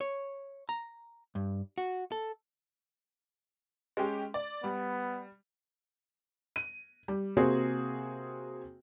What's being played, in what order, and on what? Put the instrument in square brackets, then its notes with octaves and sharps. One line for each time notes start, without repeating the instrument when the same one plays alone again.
[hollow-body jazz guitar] C#5
A#5
G2
F#4
A4
[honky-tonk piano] G#3 C#4 G4
D5
[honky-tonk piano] G3 [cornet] B3
[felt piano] D#7
G3
C3 A#3 C4 F#4 G#4